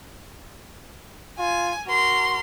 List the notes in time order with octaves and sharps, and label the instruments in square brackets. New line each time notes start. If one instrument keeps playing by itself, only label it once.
[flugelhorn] F4 [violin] G#5
[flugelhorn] F#4 [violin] A#4 C6